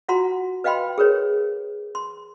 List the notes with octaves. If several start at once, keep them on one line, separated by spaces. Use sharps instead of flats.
F4 F#4 F#5 A#5 C6
B4 D#5 F5 G5 B5 C6
G#4 A#4 B4 C#5
C6